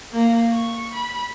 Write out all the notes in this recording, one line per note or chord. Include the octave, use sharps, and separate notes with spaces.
A#3
C#6
B5